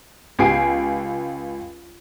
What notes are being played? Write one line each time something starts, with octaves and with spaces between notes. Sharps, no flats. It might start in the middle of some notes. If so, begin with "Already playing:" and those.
C#2 G4 G#5 C7 D7